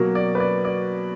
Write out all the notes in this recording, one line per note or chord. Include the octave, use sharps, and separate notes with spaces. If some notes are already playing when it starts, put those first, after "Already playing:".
Already playing: B2 F#3 A#3
D5
B4
D5
D5